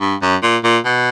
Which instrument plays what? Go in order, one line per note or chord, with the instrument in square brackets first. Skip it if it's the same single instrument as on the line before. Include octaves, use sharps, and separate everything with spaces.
[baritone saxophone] G2
F#2
A#2
A#2
B2